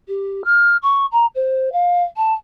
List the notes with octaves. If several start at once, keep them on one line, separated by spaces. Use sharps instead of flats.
G4
F6
C#6
A#5
C5
F5
A5